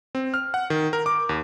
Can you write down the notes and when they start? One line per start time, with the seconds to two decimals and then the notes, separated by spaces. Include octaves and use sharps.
0.15 C4
0.34 F6
0.54 F#5
0.70 D#3
0.93 A#4
1.06 D6
1.29 D#2